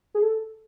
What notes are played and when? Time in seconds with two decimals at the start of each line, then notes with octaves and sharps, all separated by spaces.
0.14 G#4
0.23 A4